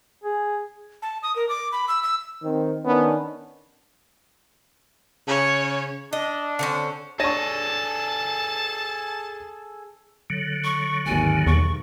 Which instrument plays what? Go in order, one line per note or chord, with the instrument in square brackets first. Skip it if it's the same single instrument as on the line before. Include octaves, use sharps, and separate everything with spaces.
[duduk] G#4
[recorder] A5
D#6
A#4
D6
B5
E6
E6
[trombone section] D#3 C4
[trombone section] D#3 C#4 D4 [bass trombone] B3
[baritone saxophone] C#3 [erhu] C#5
[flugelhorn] D4 [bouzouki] D#5
[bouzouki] D3 C4 C#4
[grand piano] D4 A#6 D#7 [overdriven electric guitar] G#4 A4 [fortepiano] C#5 C#6 [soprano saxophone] A5
[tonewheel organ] D3 F#3
[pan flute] C#6
[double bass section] G#1 D#2 [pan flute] G#5
[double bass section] B1 [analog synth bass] E2 [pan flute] C#6